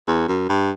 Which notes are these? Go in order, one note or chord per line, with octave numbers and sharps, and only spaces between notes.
E2
F#2
G2